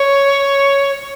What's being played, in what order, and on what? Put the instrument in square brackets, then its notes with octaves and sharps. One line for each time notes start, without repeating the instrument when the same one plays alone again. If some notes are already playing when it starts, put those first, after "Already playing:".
Already playing: [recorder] C#5